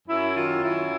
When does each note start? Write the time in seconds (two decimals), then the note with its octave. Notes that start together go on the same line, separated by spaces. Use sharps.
0.08 F#2 E4
0.35 D#3 F4
0.62 F#2 E4